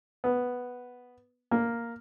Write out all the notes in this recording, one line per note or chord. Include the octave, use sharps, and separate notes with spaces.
B3
A#3